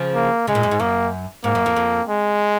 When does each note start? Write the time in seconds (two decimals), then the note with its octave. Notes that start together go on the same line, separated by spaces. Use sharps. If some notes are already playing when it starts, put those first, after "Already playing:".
Already playing: C#3 F3
0.15 A#3
0.47 C#3 G#3
0.55 A#2
0.63 F#2
0.71 G#2
0.80 F#2 A#3
1.44 G#2 A#3
1.55 F#2
1.66 F2
1.76 F2
2.08 G#3